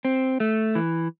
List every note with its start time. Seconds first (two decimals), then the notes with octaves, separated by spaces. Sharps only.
0.05 C4
0.40 A3
0.75 E3